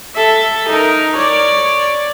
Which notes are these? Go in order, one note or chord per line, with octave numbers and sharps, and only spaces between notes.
A4 E5
D#4 A#4
C#5 D5